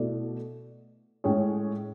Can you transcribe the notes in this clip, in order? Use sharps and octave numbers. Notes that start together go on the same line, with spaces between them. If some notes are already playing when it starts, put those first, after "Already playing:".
Already playing: B2 A3 E4 A4 D5
A2 G#3 C#4 G#4 C#5